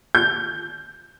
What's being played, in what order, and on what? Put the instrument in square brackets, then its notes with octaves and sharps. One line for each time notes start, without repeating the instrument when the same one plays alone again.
[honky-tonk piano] G6